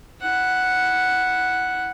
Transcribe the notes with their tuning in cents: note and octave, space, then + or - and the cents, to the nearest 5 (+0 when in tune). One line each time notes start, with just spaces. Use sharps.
E4 +0 F#5 +0